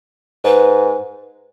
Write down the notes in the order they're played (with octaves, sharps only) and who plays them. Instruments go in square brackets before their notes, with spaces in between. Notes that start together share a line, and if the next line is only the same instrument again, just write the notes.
[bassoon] G#2 [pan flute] B4